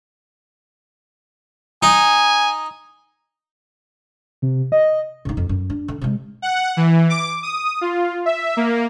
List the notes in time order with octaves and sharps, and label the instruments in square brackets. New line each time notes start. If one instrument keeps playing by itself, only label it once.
[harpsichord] D#4 [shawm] G#5
[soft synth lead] C3
D#5
[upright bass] C#3 D#4
F2
F#2
D4
D3
C3 G#3
[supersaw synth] F#5
E3
D6
D#6
F4
E5
A#3